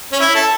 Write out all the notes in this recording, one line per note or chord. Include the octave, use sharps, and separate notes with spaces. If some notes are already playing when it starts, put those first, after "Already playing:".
C#4
E4
A4